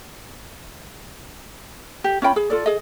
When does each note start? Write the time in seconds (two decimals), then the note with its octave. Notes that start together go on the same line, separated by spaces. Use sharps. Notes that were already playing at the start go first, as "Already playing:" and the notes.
2.04 G4
2.22 C#4 F4 G5 B5
2.36 G#4
2.50 F4 A4 D5
2.66 G#4 D#5